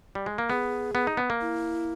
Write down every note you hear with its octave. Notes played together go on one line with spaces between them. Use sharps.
G3
G#3
A#3
B3 G#4
B3
D#4
B3
A#3
E4